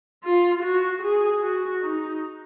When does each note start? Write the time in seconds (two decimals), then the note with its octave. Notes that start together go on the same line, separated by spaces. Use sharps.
0.24 F4
0.63 F#4
1.02 G#4
1.42 F#4
1.82 D#4